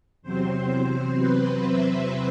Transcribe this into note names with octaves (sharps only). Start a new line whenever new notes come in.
E2 C3 F#3 C4 C5
C5
B4
E5